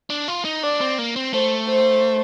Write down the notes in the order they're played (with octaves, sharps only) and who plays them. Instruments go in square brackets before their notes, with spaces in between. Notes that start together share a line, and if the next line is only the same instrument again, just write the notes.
[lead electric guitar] D4
F4
D#4
[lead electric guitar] D4 [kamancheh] D5
[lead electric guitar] C4
A#3
C4
[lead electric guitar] A3 [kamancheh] C5
[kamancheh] C5